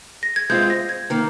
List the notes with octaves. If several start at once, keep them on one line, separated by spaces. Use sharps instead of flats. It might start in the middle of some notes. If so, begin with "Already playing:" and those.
A#6
G#6
G#3 C4 F4 G6
A#6
G#6
D#3 A#3